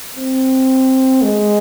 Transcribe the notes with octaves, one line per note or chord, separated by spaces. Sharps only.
C4
G#3